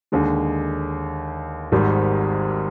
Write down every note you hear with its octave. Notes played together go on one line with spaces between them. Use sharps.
D#2 D3 G#3
G#1 G#2 D#3 G3